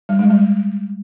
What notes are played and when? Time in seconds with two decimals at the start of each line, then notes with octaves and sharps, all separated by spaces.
0.09 G3
0.19 G#3
0.30 G3